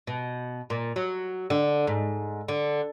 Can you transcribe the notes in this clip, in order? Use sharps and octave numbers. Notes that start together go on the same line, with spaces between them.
B2
A#2
F#3
D3
G#2
D3